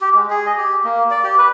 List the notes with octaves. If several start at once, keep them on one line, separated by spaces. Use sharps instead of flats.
G4
G#3
G#4
D#5
G4
A#3
D5
G4
B4